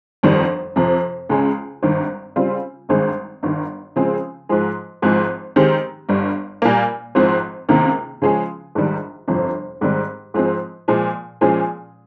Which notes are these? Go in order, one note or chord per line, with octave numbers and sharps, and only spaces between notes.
G1 F2 D#3 G3
F2 C3 F3
C#2 C#3 G#3 C#4
G#1 G2 D#3
C#3 G3 C4 F4
G#1 G2 D#3 G#3 C4
G1 G2 D#3
C#3 F3 G#3 C4
G#2 F3 G#3
G#1 G#2 F3 G#3 C4
D#3 G#3 C4 G4
G1 G2 G3
A#2 G3 A#3
G#1 G#2 F3 C4
C#2 C3 D#3 A#3
C#3 F3 G#3 C#4 G#4
A#1 G#2 D#3 G3
G1 F2 C3 F3
G#2 D#3 G3 C4 G4
G#2 F3 G#3 C4
A#2 F3 G#3
A#2 F3 G#3 C#4 G#4